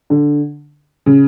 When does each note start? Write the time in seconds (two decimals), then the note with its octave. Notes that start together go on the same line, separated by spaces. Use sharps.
0.10 D3
1.06 C#3